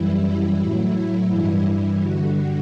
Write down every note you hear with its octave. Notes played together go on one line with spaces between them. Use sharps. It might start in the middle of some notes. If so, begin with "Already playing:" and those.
Already playing: F#2 E3 G3 E4
E4
A2 F#3
E4
G2 E3 G3
E4
G2 D3 G3 F#4